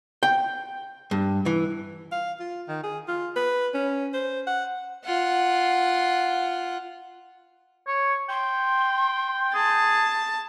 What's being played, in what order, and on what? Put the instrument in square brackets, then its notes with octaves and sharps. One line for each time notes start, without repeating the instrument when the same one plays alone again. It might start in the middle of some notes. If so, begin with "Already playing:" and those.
[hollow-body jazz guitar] G5
G2
E3
[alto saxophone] F5
F4
D#3
G#4
F4
B4
C#4
C5
F#5
[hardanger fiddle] F4 F#5
[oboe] C#5
[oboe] G5 [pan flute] C6
[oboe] G#4 [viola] A5